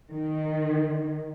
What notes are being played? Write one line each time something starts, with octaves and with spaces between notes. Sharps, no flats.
D#3